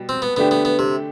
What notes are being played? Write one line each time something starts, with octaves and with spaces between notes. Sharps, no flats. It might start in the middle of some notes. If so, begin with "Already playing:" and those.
Already playing: B2 G3
C4
B3
D3 A3 B3 D4 G4
B3
B3
C3